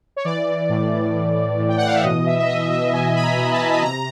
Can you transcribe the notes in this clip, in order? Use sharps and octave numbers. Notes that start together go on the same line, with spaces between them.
C#5
E3 D5
E3
A2
A2
A2
A2
A2
G5
F#5
E3
F5
E5
B2 D#5
B2 E5
E5
B2 D#5
B2 E5
B2 G#5
B2 B5
A#5
B2
A5
B2
B5
C3 A#5